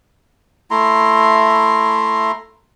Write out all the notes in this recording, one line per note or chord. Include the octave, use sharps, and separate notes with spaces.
A3 E4 A#5 C6